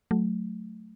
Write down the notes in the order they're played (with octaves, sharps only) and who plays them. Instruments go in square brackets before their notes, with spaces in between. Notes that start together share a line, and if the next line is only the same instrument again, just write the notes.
[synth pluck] F#3 A3